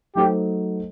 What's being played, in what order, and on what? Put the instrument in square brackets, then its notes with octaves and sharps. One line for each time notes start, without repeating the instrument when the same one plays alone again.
[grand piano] F#3 A3 D#4 A4 C5 [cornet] G4